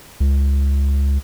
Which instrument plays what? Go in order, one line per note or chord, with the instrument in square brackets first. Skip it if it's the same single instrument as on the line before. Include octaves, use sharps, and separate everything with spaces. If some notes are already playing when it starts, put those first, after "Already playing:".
[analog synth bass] C#2